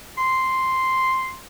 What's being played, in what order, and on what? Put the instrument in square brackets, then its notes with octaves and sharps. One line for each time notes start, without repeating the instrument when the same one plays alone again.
[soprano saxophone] C6